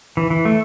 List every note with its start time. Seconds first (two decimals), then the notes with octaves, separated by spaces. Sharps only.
0.17 E3
0.30 E3
0.45 A3